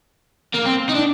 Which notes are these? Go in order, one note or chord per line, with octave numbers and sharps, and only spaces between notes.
A#3
C4
D#4
D4